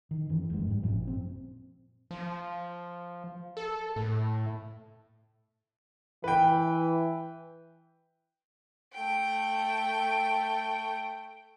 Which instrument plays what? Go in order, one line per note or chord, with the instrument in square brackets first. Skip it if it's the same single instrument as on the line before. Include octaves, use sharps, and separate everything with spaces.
[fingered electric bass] D#3
F#2 E3
F1 F#2 A#2 G#3
G#2 G3
G#1 F#2 A#2 F3
C4
[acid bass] F3
A4
A2
[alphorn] E3 [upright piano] B4 G5
[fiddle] A3 G5